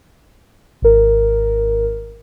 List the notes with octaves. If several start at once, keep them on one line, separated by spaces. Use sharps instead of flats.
G#1 A#4